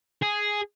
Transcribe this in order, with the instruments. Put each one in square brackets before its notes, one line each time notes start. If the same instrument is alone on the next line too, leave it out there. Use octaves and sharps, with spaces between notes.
[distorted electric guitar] G#4